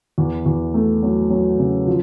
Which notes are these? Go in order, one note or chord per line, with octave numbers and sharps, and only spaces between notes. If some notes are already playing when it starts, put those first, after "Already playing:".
E2
E2
A3
F#3
F#3
C#3
F3